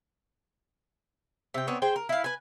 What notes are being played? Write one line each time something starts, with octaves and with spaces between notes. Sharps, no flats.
C3 G5
B3 C4 D4 C#5
G#4 C5 G5
A#4
E4 F5
B4 G#5